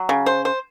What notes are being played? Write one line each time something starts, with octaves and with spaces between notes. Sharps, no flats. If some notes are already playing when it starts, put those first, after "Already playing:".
Already playing: F#3
C#3
C5
C5